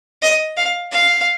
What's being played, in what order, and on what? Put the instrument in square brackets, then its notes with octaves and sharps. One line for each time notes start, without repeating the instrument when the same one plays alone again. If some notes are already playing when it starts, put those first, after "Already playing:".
[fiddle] D#5
F5
F5